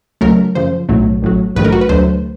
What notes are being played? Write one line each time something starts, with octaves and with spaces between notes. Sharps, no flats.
C#2 C#3 F#3 A3 A#4
F#2 C#3 F3 C5
B1 A2 F#3 A3
A1 A2 F#3
A#1 G#2 D#3 F#3 A3 B4
A#4
F#4
B4
D2 D3 F#3 A3 C5